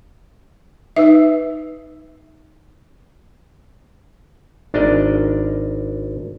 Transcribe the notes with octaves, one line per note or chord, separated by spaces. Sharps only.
D#4 B4 E5 E6
G#1 D4 A#4 D5 D#5